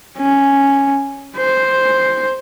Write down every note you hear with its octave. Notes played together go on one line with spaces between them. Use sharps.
C#4
C5